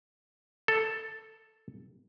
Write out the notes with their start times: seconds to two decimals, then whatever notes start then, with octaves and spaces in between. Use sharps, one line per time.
0.68 A4